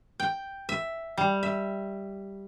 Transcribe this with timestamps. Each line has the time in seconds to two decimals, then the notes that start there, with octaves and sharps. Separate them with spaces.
0.20 G5
0.69 E5
1.17 G3
1.43 E5